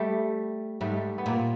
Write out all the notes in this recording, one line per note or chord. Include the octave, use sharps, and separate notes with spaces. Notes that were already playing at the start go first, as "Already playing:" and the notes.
Already playing: G3 A3
G#2 G3 A3
B3
A#2 A#3 C4